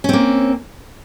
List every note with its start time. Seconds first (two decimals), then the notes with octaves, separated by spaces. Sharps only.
0.04 C#4
0.09 C4
0.13 A#3